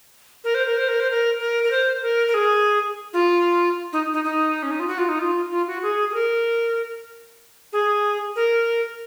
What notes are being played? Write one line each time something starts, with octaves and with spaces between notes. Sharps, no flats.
A#4
C5
A#4
C5
A#4
C5
A#4
A#4
A#4
C5
A#4
A#4
G#4
F4
D#4
D#4
D#4
C#4
D#4
F4
F#4
F4
D#4
F4
F4
F#4
G#4
G#4
A#4
G#4
A#4